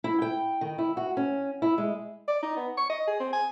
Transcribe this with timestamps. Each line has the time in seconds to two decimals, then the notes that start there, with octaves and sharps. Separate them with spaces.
0.04 E4
0.22 G5
0.61 D#3
0.78 E4
0.97 F#4
1.17 C#4
1.62 E4
1.78 G#3
2.28 D5
2.42 D#4
2.57 B3
2.77 C#6
2.89 D#5
3.07 G#4
3.20 C4
3.33 G#5